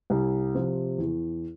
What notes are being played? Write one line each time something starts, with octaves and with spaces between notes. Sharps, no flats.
C2
C3 F3
E2